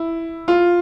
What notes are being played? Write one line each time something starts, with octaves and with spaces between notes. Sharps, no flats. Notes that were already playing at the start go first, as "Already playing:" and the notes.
Already playing: E4
F4